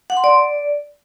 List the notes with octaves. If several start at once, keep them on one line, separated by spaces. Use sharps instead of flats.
F#5
C6
D5